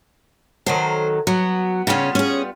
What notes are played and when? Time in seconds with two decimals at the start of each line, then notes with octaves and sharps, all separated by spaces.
0.66 D#3 F#3 A4 C5
1.27 F#3 B3
1.87 C#3 G3 B3 C#4 F4
2.15 C#4 G#4